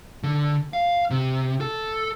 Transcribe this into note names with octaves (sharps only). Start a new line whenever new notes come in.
D3
F5
C3
A4